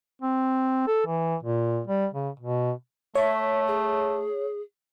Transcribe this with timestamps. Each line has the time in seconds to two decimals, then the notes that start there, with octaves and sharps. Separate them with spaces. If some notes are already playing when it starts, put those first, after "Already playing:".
0.22 C4
0.87 A4
1.06 E3
1.43 A#2
1.87 G3
2.14 C#3
2.40 B2
3.15 A3 C#5 E5
3.67 G#4